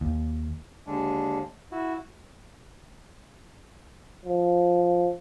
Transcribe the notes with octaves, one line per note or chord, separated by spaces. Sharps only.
D#2
D#2 D3 G#3 D4
E4 F#4
F3